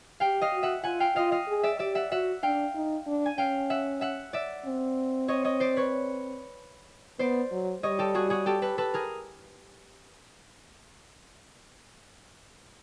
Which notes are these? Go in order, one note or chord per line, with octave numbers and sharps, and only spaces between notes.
G4 F5 G5
D#5 F5
F#4
E5 F#5
F4 F#5 G#5
F5 G5
F4 D#5 F5
D#5 F5
G#4
D5 E5
G4 D5 E5
E5 F#5
F#4 E5 F#5
D4 F5 G5
D#4
D4
G#5
C#4 F5 G5
E5 F#5
E5 F#5
D5 E5
C4
C#5 D#5
C#5 D#5
C5 D5
B4 C#5
B3 C5 D5
F#3
G3 C#5 D#5
G4 A4
F#4 G#4
F#4 G#4
G4 A4
A4 B4
A4 B4
G#4 A#4